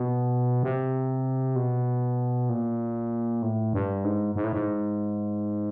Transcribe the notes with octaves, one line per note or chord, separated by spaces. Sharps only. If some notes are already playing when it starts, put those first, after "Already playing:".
Already playing: B2
C3
B2
A#2
A2
G2
G#2
G#2
A2
G#2